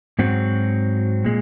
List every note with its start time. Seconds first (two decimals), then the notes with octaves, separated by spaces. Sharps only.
0.19 G#2 F#3 C4 F#4
1.24 A#2 G#3